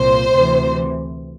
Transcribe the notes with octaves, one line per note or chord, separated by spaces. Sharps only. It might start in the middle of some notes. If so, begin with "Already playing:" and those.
Already playing: C2 A#2 C5
D2 C3 E3